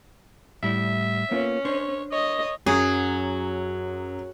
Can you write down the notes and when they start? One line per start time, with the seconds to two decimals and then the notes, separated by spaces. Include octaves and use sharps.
0.63 A2 G3 E4 E5
1.31 A#3 B3 C#4 F4
1.65 D4 C5 C#5
2.12 C#5 D#5
2.66 F#2 F#3 G#4